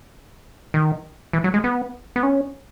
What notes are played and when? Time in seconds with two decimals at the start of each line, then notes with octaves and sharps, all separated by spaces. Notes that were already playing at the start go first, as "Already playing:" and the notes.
0.74 D#3
1.33 E3
1.44 F#3
1.54 G#3
1.64 B3
2.16 B3
2.23 C#4